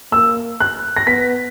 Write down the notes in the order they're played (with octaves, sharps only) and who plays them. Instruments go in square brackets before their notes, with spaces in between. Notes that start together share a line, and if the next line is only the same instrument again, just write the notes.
[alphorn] A#3 [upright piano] E6
[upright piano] F#6
A#6
[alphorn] B3 [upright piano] B6